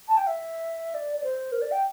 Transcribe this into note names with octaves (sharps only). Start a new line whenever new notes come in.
A5
G5
E5
D5
D5
C5
A#4
D5
G5